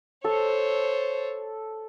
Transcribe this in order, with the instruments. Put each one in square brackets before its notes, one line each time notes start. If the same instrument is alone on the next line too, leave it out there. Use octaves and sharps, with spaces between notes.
[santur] A4 [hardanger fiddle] C5 C#5